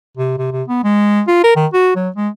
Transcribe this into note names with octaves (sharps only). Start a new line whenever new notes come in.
C3
C3
C3
B3
G#3
F4
A#4
D#3
F#4
F#3
G#3